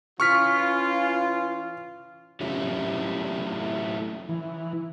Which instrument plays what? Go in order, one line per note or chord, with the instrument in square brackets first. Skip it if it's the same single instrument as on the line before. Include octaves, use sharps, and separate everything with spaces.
[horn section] E3 C#4 F4 [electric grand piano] C#6 F6 B6
[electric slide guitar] F#3 A3 C#4 E4 F4 G4
[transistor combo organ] E3